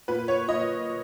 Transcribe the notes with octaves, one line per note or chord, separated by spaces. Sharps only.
A#2 B4
C#5
A#2 D#5